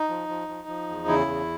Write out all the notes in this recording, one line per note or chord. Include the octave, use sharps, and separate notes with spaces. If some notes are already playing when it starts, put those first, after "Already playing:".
Already playing: D#4
F3
F3
F3
F3
E2
C#3 E4
E2